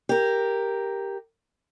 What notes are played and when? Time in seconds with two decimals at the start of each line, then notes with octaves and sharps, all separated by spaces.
0.09 G4 A#4